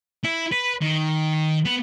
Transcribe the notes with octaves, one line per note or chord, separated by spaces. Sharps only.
E4
B4
D#3
B3